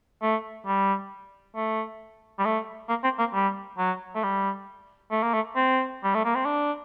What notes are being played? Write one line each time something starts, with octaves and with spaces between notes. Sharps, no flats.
A3
G3
A3
G3
A3
A#3
C4
A#3
G3
F#3
A3
G3
A3
A#3
A3
C4
G3
A3
A#3
C4
D4